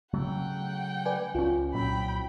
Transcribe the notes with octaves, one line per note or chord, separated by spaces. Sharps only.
C#3 F#3 A3 F#5 G5
B4 D5 G#5
C#2 C#4 F4
C2 A#2 F#3 G5 B5